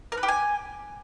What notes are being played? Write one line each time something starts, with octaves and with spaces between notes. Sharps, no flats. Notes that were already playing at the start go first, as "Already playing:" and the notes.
A#4
B4
G4
G#5